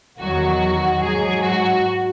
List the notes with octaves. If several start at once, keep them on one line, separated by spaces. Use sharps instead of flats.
E2 D#3 F#3 F#4
G#2 F#3 G#4
F#4